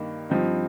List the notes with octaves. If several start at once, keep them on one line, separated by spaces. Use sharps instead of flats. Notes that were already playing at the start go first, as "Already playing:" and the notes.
Already playing: G2 D#3 A#3
G2 F3 C4 D#4